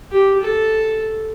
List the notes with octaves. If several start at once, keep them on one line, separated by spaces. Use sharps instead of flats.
G4
A4